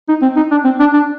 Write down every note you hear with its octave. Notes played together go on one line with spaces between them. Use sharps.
D#4
C4
D#4
D4
C4
D4
D4